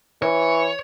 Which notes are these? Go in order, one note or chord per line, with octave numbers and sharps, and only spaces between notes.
E3 C#5